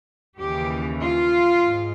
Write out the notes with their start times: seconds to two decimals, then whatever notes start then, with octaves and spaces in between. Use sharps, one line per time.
0.39 D#2 C#3 E3 G4
1.01 F4
1.63 G#2